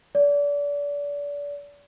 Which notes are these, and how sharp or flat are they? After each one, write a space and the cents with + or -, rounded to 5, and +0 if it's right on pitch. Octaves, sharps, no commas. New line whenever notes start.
D5 -30